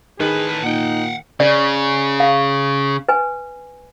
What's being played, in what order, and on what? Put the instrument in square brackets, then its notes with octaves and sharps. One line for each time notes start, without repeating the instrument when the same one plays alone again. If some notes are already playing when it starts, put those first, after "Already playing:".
[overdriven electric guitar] A2 B4 [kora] D#3 [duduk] G#4
[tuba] A#2 [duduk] D#4 [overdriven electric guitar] F#5 G5
[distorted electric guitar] C#3 [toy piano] D5
[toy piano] F5
B4 G#5